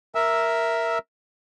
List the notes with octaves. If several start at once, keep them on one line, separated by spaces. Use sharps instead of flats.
A#4 E5 E6